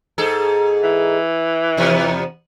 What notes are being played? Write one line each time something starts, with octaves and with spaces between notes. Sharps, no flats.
G#2 G#4 A4
E3
E2 C3 B3